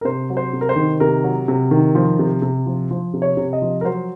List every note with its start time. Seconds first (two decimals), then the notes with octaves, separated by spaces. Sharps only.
0.01 A#4
0.05 C3 C5
0.30 F#3
0.37 C5
0.53 C3
0.61 A#4
0.69 C5
0.76 D#3
1.00 C3 A#4
1.24 F#3
1.48 C3
1.71 D#3
1.95 F3
2.19 C3
2.42 C3
2.66 F3
2.91 F3
3.14 C3
3.22 C#5
3.37 C3
3.53 D#5
3.62 F3
3.81 A#4
3.84 F#3 C5